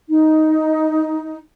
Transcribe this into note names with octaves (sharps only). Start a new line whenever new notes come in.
D#4